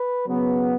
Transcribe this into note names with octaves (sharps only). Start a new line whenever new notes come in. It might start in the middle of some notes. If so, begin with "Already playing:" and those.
Already playing: B4
C#3 F#3 B3